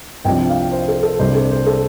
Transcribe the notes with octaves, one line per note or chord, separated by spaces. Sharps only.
C2 C3 F3 D4 G5
F5
C5
A4
A4
C2 C3 G3 D4 C5
A4
C5
A4